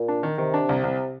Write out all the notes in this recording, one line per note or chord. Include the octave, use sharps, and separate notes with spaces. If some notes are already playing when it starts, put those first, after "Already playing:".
Already playing: A#2
D4
D#3
C3 D#3
D4
C2
C2